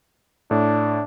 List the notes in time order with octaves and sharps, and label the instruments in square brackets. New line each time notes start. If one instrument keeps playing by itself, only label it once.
[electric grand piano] A2 [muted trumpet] D4